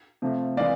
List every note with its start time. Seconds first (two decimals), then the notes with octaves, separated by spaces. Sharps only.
0.22 C3 F3 A3
0.57 C3 E3 G#3 D5 F5